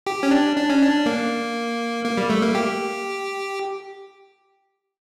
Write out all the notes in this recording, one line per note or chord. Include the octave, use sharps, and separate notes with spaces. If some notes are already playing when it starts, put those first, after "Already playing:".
G4
C#4
D4
D4
C#4
D4
A#3
A#3
G3
A3
A#3
G4